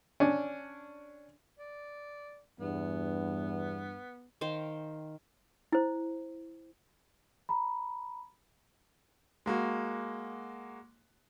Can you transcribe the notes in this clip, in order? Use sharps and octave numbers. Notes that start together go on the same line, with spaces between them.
C#4 D4
D5
E2 G2 B3
D#3 C5 F5 G5
E4 C5
A#5 B5
G#3 A#3 F#4